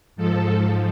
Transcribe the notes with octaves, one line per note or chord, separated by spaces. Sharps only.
G#2 F3 A4